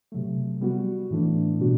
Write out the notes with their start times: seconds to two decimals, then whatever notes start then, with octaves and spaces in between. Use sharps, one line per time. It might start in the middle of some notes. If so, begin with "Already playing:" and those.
0.12 C3 F#3 A3
0.61 G3 B3 F#4
1.10 A2 E3 A3 D4
1.60 B2 G3 B3 D4 F#4